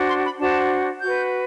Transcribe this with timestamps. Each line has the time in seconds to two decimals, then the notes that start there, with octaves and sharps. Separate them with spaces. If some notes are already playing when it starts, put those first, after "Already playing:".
Already playing: D4 F#4 C5
0.08 C6
0.23 B5
0.39 D4 F#4 C5 A5
1.02 F#4 B4 G6